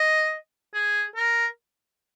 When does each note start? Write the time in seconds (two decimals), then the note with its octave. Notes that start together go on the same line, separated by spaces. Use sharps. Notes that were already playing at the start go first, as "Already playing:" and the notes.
Already playing: D#5
0.74 G#4
1.16 A#4